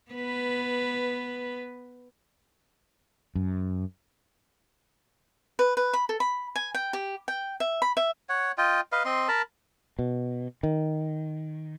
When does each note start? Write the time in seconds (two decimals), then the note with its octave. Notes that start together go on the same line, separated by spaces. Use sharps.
0.12 B3 B4
3.35 F#2
5.59 B4
5.77 B4
5.93 B5
6.09 A4
6.20 B5
6.56 G#5
6.74 G5
6.93 G4
7.28 G5
7.60 E5
7.82 B5
7.97 E5
8.29 C#5 F#5
8.58 F4 D#5 G5
8.92 B4 D#5 F5
9.05 C4 D#5 C6
9.28 A#4 A5 B5
9.99 B2
10.63 D#3